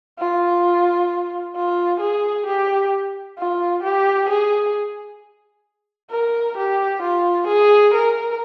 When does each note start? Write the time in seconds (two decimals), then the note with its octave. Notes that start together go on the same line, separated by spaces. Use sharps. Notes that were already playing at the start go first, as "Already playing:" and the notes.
0.19 F4
1.56 F4
2.00 G#4
2.46 G4
3.38 F4
3.83 G4
4.29 G#4
6.11 A#4
6.57 G4
7.02 F4
7.47 G#4
7.94 A#4